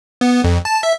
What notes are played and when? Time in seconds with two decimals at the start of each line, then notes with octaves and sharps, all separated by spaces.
0.21 B3
0.44 F2
0.65 A5
0.83 E5